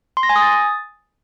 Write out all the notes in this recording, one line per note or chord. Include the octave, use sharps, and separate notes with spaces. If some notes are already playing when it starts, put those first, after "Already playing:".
C6
A#6
G#5
D#6
A6